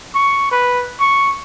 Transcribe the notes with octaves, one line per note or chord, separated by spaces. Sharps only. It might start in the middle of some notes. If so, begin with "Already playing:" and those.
C#6
B4
C#6